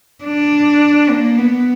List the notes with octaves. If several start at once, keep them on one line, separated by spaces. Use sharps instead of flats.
D4
A#3
B3